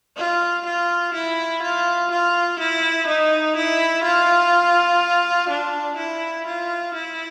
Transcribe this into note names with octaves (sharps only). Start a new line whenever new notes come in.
F4
F4
E4
F4
F4
E4
D#4
E4
F4
D4
E4
F4
E4